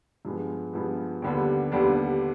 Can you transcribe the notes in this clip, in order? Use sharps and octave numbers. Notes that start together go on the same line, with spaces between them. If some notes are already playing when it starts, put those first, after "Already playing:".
G2 F3 G#3 B3
G2 F3 G#3 B3
D#2 D3 G3 B3 D4
D#2 D3 G3 B3 D4